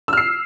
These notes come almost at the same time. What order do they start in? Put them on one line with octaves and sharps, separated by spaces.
E6 F6 C7